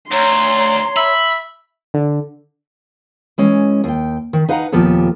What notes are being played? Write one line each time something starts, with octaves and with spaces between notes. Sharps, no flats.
D2 C#5 A#5 C6
E5 B5
D3
E3 G#3 C#4
D#2 G5
D#3
D#4 B4 F5 F#5 A#5
D#2 A#2 F3 B3 G4 A4